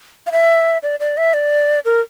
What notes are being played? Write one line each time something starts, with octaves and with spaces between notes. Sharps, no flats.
F5
E5
D5
D5
E5
D5
A#4